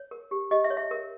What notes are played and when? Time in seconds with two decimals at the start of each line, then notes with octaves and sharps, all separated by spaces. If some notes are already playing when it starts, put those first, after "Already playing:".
Already playing: C#5
0.11 A#4
0.31 G4
0.51 G4 D#5
0.64 E5
0.70 C#5
0.77 E5
0.91 A#4